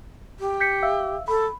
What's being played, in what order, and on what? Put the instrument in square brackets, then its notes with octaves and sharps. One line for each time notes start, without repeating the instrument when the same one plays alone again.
[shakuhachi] G4
[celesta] G6 B6 C#7
E5 F5 E6
[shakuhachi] A4 [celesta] B5